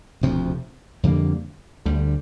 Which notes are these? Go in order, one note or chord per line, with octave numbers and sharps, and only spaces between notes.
E1 D2 C3 F3
F2 D3 G3 A#3
D2 D3 G3